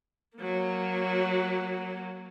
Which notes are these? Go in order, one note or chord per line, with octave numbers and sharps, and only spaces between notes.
F#3 A#3